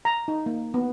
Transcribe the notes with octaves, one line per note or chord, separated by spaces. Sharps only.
A#5
D#4
A#3
B3